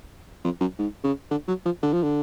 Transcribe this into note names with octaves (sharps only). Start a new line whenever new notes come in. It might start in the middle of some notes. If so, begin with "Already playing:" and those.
F2
F#2
G#2
C#3
D3
F#3
F3
D3
F3
D3